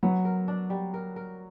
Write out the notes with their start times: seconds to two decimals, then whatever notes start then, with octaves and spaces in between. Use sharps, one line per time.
0.03 F#3 B3
0.25 A#4
0.48 D4
0.70 G3
0.94 A#4
1.16 A#4